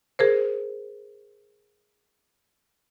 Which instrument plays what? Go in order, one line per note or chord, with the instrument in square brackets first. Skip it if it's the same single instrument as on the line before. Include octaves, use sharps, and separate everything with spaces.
[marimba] G#4 A#4 C5